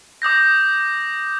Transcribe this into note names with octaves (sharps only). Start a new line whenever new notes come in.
D6 D#6 G6 A#6